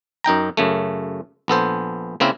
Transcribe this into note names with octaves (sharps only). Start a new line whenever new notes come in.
F#2 D#4 G5 A#5
F#2 C#3 A3
A#1 B3 A4 C5
C#3 A#3 C4 E4 A#4